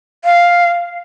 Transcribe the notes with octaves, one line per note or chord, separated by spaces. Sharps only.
F5